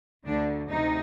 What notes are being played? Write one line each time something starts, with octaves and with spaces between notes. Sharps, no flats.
D2 D3 D4
D2 C3 D#4